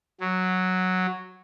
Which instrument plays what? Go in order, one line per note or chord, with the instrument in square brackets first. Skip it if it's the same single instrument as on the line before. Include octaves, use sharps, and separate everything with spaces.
[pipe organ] F#3